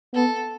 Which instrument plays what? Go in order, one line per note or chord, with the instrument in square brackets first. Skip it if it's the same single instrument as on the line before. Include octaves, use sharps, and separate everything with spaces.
[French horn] B3 [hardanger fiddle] A4